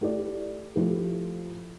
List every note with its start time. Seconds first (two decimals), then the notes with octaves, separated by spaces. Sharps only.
0.01 A3 E4 G4 D5
0.76 F3 A3 E4 G4